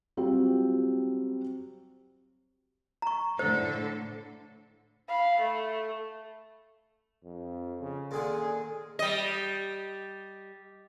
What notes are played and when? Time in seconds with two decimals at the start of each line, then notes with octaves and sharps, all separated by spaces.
0.17 F#3 G3 C4 F4 F#4
3.02 A#5 C#6
3.39 A2 D3 A4 C5
5.09 F5 B5
5.40 A3
7.24 F2
7.80 C#3
8.11 A#2 D3 D#3 G#4
8.99 G3 D#5